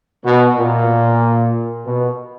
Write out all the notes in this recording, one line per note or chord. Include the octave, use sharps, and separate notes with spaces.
B2
A#2
B2